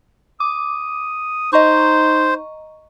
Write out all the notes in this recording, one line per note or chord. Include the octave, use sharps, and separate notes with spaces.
D6 D#6
D#4 C5 D#5 A#5 C#6